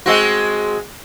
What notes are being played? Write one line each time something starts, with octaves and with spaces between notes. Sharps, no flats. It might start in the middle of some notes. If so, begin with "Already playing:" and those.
G#3 C4 F#4